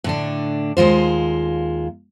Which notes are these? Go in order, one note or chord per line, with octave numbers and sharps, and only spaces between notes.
A2 D3 D4
D#2 G#3 F4 C5